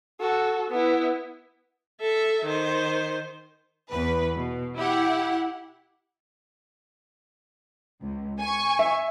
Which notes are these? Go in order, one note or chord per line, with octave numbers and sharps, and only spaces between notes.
F#4 A4
B3 E4
A4 E5
D#3 C5
E2 B4
B2
E4 G4 F#5
C#2
G#5 C#6
E5